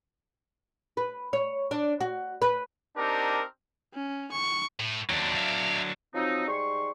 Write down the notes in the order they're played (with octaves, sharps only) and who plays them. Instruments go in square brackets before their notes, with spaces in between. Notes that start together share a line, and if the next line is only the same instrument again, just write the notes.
[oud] B4
C#5
D4
F#4
B4
[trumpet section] C4 D4 D#4 G4 A#4
[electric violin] C#4
C#6
[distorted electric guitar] A2
[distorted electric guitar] D#2 [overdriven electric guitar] F#3 D4
[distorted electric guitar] E5 F5
[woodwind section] F3 F#3 C4 D#4
G#2 G3 C6 C#6